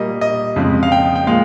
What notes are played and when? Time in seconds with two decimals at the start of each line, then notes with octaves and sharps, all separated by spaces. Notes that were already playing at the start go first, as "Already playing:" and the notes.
Already playing: A#2 G3 A#3 D#5
0.21 D#5
0.56 F2 C#3 G#3
0.83 F5
0.92 G5
1.16 G5
1.27 A#2 F3 G#3 F5